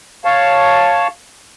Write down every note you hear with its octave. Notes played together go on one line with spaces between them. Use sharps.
C#5 F5 A5